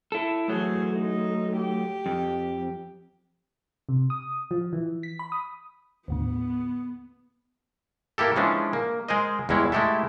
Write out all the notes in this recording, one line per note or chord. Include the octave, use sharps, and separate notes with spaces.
E4 A4
E3 F#3 A3 G#4
D#4
G4
F2
C3
D#6
F3
E3
B6
B5
D#6
D#2 A2 D3 B3
A#3 E4 G4 A4
E3 F3 G#3 C#4 D4
A#3
G#3 G#4 A#4 C5 D#5
E2 G3 G#3 E4 C#5
G#3 A3 E4 G4 A4 E5